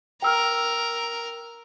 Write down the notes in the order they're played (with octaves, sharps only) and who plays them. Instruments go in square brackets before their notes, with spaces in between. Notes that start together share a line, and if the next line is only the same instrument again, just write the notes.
[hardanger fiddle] A#4 [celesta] G5 E6 F6